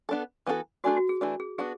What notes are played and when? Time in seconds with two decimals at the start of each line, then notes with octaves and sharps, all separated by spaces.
0.09 B3 D4 A4
0.46 E3 B3 D4 F#4 A4
0.84 A3 D4 F#4 G#4 D5
0.97 F#4
1.09 G#4
1.21 E3 A3 D4
1.40 G#4
1.58 B3 D4 F#4 G#4